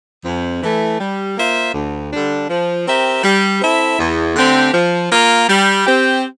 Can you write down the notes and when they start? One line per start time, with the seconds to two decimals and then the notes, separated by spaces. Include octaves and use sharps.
0.25 F2
0.62 E3 A3
1.00 G3
1.37 A#3 F4 C5 E5
1.74 D2
2.12 D3 G3 D4
2.49 F3
2.87 C4 G4 A#4 E5
3.23 G3
3.61 C4 E4 A4 E5
3.99 E2
4.36 D3 A3 C4 G4
4.73 F3
5.11 A#3 F4 A#4
5.48 G3
5.85 C4 G4